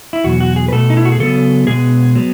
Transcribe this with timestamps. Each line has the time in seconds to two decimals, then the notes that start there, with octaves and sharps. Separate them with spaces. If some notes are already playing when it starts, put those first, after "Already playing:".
0.13 E4
0.24 E2 B2 F#3 F#4
0.40 F#4
0.56 G#4
0.68 B4
0.72 B2 A3 A4
0.90 D#4
0.97 E4
1.05 F#4
1.12 G#4
1.19 C#3 F#3 B3 A4
1.67 B2 G#3 B3 G#4
2.16 F#3 B3